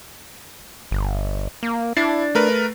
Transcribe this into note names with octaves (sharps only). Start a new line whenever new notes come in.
G1
A#3
D4 E4 A6 C7
A3 A#4 B4